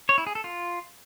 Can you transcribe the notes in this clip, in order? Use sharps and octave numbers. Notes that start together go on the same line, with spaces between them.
C#5
E4
G#4
A4
F4